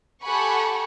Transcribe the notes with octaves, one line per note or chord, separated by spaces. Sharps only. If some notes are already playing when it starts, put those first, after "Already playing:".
G4 A4 F#5 G#5 B5 C#6